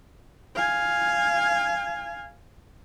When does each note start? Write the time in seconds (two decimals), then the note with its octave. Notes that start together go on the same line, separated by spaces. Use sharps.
0.55 F5 G#5